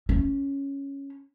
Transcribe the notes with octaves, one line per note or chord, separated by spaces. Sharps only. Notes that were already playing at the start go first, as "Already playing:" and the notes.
C#4